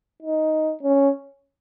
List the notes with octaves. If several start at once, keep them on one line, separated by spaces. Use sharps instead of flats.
D#4
C#4